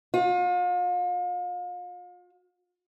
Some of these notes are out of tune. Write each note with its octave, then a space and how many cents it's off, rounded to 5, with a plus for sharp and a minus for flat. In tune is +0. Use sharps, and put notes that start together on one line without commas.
F4 +40